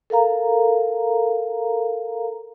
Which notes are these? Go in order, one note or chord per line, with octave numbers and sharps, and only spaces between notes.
A4 A#4 F5 A#5